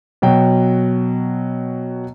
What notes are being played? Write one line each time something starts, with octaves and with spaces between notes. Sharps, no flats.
B2 F#3 G5